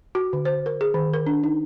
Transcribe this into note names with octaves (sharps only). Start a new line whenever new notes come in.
F#4
D3
C5
A#4
G#4
D#3
A#4
D4
D#4